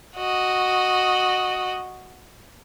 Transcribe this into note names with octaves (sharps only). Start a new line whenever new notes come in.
F#4 D#5